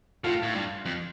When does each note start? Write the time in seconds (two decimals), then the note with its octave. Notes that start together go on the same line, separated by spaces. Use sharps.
0.24 A2 F4
0.43 A2
0.54 G2
0.85 F2